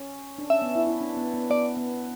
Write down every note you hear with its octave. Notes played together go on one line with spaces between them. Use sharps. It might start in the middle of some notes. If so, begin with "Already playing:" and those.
Already playing: C#4
D4
C#4 E5
B3
E4
E4
D4
B3
B3
B3 D5
B3